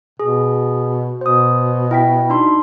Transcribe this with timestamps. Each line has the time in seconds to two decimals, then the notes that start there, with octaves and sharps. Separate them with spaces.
0.20 B2 G#4
1.21 B2 C5 D#6
1.91 E4 G5 B6
2.30 D4 D#4 C6